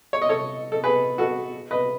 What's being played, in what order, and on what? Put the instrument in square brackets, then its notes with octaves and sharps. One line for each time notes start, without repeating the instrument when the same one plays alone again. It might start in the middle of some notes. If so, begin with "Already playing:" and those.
[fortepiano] C#5
D#5
A4 C#5
A4
G#4 B4
F#4 A4
B4 D#5